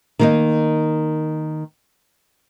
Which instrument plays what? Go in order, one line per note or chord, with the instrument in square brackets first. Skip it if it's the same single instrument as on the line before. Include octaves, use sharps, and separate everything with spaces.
[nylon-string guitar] D#3 A#3 D#4